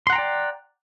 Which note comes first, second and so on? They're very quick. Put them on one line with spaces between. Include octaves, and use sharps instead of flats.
C6 F#5 A#5 G5 D5